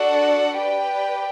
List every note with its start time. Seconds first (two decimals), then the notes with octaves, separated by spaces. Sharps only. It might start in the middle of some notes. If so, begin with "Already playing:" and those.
Already playing: D4 F#4 A4 D5 F#5
0.57 G4 B4 D5 G5